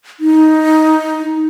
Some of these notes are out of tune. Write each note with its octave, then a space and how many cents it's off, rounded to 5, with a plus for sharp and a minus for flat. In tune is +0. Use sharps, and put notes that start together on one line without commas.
D#4 +10